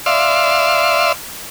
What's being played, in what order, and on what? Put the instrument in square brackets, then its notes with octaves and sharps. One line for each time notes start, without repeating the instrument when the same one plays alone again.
[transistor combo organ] D5 E5 F5 C6